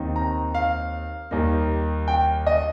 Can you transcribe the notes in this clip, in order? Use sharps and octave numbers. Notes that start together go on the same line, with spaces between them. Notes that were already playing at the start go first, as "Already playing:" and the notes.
Already playing: D#2 D#3 C4
A#5
F5
D#2 D#3 G3 A#3
G5
D#5